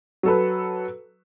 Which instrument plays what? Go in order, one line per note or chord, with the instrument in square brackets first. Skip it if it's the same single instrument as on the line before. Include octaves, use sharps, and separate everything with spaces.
[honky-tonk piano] F#3 A4 B4